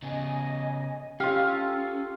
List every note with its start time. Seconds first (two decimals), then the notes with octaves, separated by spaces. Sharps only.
0.02 C#3 B3 D#5 G#5
1.20 C#4 F4 G4 A4 F5